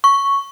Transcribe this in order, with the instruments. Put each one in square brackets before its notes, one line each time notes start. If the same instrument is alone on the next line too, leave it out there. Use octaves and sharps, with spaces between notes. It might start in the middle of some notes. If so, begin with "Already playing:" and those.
[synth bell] C#6